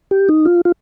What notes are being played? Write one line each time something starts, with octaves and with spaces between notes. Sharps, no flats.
G4
D#4
F4
F4